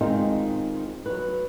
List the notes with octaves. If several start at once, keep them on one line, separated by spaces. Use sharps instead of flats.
D#3 G#3 C4 D#4 F4
F#3 B4